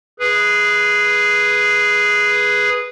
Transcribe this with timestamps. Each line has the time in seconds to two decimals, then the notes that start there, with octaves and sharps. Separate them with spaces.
0.20 G#4 B4